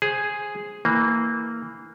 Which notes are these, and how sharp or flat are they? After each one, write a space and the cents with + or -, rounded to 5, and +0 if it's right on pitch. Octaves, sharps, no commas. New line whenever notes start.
G#4 +0 C5 +0
E3 -10 A#3 -15